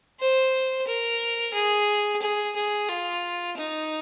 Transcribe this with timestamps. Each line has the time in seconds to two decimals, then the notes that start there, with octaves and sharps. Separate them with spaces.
0.20 C5
0.88 A#4
1.54 G#4
2.22 G#4
2.56 G#4
2.89 F4
3.57 D#4